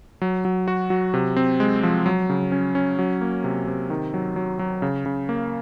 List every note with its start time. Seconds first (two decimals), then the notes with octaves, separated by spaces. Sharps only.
0.22 F#3
0.45 F#3
0.68 F#4
0.90 F#3
1.14 C3
1.36 C4
1.60 G#3
1.83 F3
2.06 F#3
2.30 C#3
2.52 C#4
2.75 C#4
2.99 F#3
3.21 A#3
3.44 C3
3.67 C3
3.90 D#3
4.14 F#3
4.36 F#3
4.59 F#3
4.82 C#3
5.06 C#3
5.29 A#3